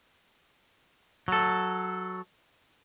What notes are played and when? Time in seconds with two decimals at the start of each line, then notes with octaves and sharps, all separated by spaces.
1.28 F#3 A4